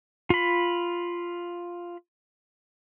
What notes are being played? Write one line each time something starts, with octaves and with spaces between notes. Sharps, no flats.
F4 B5